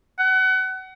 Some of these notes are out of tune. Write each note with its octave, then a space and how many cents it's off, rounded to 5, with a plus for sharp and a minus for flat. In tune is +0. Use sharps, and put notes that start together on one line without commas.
F#5 +30